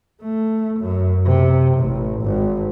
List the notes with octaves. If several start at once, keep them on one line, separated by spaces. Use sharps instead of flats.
A3
F#2
C3
A1
G#1